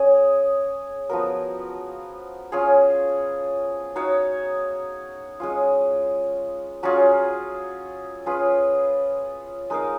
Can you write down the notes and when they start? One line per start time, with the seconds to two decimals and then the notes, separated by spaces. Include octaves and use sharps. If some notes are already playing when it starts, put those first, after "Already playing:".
Already playing: C#4 G#4 C#5
1.09 F3 B3 F#4 A#4
2.52 C#4 F4 G#4 C#5
3.96 D#4 F#4 C#5 F5
5.40 G#3 C#4 F4
6.83 F#3 C#4 F4 G#4
8.26 C#4 F4 G#4 B4
9.70 G#3 D#4 A#4 F5